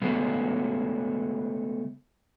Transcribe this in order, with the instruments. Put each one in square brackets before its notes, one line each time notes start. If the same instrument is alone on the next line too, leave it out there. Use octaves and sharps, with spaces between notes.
[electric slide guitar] C#3 G#3 A3 B3